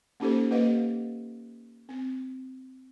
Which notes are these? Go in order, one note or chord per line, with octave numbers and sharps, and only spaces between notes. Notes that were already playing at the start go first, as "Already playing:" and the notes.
A#3 C#4 D#4 G4 A4 C5
A#3 G4 B4 D#5 F5
C4